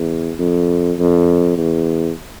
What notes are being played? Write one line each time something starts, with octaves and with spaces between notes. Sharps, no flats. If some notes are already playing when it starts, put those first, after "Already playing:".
Already playing: E2
F2
F2
E2